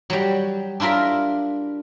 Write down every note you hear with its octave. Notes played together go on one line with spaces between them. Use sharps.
F#3 G3
D4 E4 F4 A#4 E5